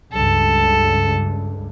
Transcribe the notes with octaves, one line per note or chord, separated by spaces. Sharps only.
C#2 G2 A4